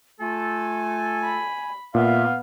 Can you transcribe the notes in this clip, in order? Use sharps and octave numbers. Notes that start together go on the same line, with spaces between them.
A3 F4 A4 G#5
B5
A#2 B3 E5 F5